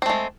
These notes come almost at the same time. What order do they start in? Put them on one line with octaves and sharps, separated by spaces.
C4 A3 G#3